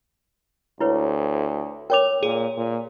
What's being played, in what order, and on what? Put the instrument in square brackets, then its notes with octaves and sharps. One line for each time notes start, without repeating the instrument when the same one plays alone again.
[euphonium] D2 [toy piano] E4 B4 C#5
[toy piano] A#4 C#5 D6 [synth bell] G5 F7
[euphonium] A#2 [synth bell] G#4
[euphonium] A#2